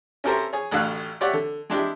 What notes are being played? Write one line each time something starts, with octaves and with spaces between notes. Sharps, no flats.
C#4 E4 G4 A4 A#4 C5
G#4 C#5
A1 D2 A2 D3 F5 F#6
G4 C#5 D5 E5 F#5
D3
G#3 D4 E4 G4